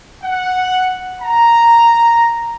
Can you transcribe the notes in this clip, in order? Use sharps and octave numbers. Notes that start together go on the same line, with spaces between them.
F#5
A#5